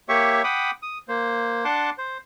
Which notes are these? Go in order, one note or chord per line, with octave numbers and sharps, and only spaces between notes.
A#3 G4 C#5 E5 C#6
F#5 G5 B5 D6 D#6
D#6
A#3 C5
D4 F#5 A5 C6 D6
C5